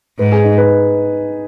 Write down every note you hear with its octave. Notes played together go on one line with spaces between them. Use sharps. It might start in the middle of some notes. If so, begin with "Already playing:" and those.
G#2 B4
G#4
D#4
B4